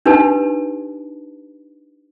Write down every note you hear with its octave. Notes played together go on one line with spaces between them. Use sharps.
D4 D#4 G4 B4 A5